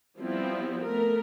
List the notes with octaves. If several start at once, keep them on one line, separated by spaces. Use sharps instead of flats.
F3 G3 B3 C4 E4
A3 B3 A#4